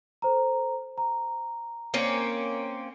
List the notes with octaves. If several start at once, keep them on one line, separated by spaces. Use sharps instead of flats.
A4 C5 A#5
A#5
A#3 C4 C#4